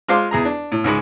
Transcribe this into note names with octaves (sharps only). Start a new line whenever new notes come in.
G#3 F4 C5 F5 C6 D6
E2 G#4 A#5
D4
A2
C#2 G#2 G#3 B5